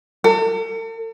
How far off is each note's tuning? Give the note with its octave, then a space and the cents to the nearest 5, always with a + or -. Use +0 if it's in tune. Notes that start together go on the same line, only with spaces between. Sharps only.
A4 +45